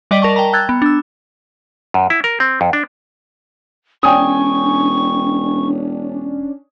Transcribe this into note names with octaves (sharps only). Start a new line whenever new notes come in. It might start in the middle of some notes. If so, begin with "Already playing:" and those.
G3 D5 D#5 G5 B6 F#7
A#4 A5 C#6
G5 A5 A#5
G5 E6 F#6 G#6 A6
B3
D4 E6
F#2
E4
A#4
C4
F2
D4
E1 C#4 D4 G5 G#5 C#6 D#6